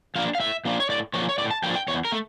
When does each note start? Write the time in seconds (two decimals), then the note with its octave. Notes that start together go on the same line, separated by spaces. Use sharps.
0.15 F3 A#3 D4 F5
0.35 F5
0.40 A2 E5
0.65 F3 A#3 D4
0.80 C#5
0.89 A2 D5
1.14 F3 A#3 D4 C#5
1.29 C#5
1.38 A2 D5
1.51 A5
1.63 F3 A#3 D4 G5
1.75 G5
1.88 E2 C#5
2.05 A#4
2.12 A3